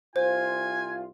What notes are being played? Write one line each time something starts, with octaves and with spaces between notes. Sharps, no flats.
C2 F4 C5 G#5